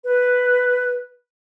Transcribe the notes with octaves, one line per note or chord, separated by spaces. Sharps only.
B4